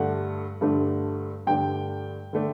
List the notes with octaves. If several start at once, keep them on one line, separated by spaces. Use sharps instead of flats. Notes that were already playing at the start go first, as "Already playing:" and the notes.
Already playing: G2 D3 A3 D4 F#5
G2 D3 A3 D4
G2 D3 A3 D4 G5
D3 A3 D4